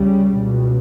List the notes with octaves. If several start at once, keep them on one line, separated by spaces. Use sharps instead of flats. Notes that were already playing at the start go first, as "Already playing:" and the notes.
Already playing: C#2 C#3 G3
C#2 B2